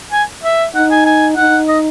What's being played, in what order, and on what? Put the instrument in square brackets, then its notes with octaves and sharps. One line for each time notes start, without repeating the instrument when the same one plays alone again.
[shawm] G#5
E5
[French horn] D#4 [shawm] F#5
[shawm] G#5
G#5
[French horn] D#4 [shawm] F#5
[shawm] D#5